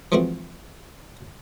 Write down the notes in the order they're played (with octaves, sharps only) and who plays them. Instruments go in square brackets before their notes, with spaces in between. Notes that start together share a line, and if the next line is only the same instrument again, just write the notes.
[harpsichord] E3 F3 G#3 A3 C4 F#4